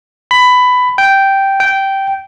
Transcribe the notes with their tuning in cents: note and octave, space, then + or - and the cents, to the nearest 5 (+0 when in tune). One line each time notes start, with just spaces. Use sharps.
B5 +15
G5 -5
G5 -10